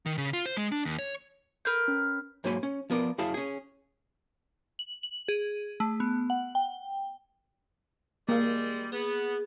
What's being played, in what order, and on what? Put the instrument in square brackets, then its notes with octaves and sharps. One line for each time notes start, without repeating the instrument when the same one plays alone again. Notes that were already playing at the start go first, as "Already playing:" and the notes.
[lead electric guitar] D#3
C#3
F4
C5
G#3
D4
D#2
C#5
[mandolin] A#4 B4 G6
[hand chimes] C#4
[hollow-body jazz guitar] G#2 F#3 A#3 C5 G#5 B5
C#4
F3 B3 A#4 D5
F#2 E4 G#4 F5 A5
C#4 G#4
[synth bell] F#7
F#7
G#4
A3
B3
F#5
G5
[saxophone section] G3 G#3 [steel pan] A#3
[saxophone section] B3 [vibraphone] G#4